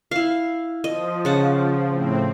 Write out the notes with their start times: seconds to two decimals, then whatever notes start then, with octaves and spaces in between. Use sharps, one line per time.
0.11 E4 F5
0.84 F3 D#5
1.25 C#3 F#5 A5
1.87 A2 C4